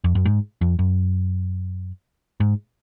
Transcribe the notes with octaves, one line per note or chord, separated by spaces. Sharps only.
F2
F#2
G#2
F2
F#2
G#2